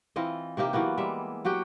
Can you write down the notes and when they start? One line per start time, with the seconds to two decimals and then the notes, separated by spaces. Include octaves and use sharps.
0.16 E3 C4 F4 D#5
0.57 C3 A#3 D#4 G4
0.73 E3 F#3 A#3 B3
0.97 G3 G#3 E5
1.45 F#3 F#4 G4 G5